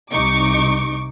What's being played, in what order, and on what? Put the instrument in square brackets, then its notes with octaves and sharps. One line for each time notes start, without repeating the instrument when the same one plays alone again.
[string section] C2 C3 D#4 C#6 D6